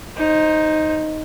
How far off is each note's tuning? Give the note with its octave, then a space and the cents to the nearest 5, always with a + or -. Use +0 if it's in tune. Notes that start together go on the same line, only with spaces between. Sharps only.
D#4 +0 C5 +20